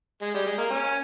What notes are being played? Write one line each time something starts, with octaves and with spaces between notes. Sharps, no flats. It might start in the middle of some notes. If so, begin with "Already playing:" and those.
G#3
G3
G#3
A#3
C#4